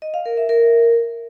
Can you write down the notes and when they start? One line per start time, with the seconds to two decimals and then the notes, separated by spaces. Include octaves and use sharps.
0.02 D#5
0.14 F5
0.26 A#4
0.37 E5
0.49 A#4